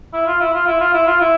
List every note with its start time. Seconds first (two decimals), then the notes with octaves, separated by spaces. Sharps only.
0.13 E4
0.27 F4
0.41 E4
0.54 F4
0.67 E4
0.80 F4
0.94 E4
1.07 F4
1.21 E4